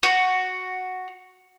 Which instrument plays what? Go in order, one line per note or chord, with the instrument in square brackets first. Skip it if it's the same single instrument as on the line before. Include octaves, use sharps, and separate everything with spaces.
[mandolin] F#4